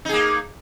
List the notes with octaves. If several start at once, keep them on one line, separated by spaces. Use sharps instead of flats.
A#3 D#4 G#4